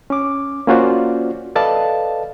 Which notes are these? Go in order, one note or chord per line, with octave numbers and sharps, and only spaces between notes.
C#4 D6
A#3 C#4 F4 F#4 C5 D5
A4 B4 D5 D#5 F5 A5